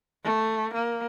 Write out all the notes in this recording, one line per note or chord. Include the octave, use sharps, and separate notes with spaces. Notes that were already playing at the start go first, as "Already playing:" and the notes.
A3
A#3